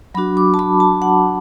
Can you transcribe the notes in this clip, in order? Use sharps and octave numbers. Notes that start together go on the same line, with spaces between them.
F#3 D4 F#4 B5
D6
A5
B5
A5
F#5